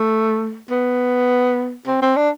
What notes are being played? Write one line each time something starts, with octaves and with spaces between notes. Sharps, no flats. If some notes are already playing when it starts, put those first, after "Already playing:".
Already playing: A3
B3
C4
C4
D4